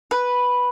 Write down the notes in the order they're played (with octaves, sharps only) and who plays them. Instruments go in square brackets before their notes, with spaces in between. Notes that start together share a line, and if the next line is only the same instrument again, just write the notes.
[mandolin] B4